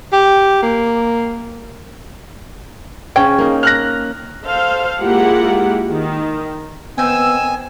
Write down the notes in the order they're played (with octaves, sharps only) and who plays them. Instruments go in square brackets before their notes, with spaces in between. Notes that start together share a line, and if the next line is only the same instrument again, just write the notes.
[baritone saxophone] G4
A#3
[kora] C#3 C#4 [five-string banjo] G5
[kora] A#3 D#4
[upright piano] F6 F#6 A#6
[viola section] A4 C5 F5
G#3 A#3 E4 F4 G4 F#5
D#3
[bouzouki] D#3 C4 [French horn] B3 [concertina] G#5 [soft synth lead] E6